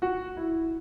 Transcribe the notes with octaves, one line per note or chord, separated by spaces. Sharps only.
F#4
E4